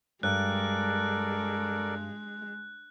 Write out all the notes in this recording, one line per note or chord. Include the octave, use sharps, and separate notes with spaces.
G2 G#3 A4 A#4 D5 F#6